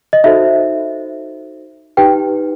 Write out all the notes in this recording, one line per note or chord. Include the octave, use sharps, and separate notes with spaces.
D#5
D#4 F#4 A4 C5 E5
D#4 G4 B4 G5